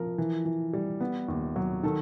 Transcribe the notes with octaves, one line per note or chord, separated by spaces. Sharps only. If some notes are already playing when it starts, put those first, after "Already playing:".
Already playing: F3 A#4
E3
E3
G3
B3
D#2
F#3
D#3 A4